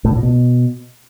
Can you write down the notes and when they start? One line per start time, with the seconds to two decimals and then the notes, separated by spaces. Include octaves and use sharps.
0.05 A2
0.11 D3
0.17 A#2
0.23 B2